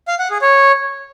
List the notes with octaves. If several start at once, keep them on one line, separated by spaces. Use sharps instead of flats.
F5
F#5
G#4
C#5